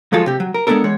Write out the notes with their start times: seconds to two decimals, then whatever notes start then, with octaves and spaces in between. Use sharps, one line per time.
0.13 F3 F#3 G#3 F4 A4
0.26 C3 G4
0.40 F#3
0.54 A#4
0.67 G#3 B3 C4 D4 A4 A#4
0.84 E2 G#3 C#5